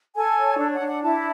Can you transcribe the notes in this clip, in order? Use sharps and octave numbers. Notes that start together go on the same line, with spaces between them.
A4 G#5
C#5
D4
F#5
D4
F#5
E4 A5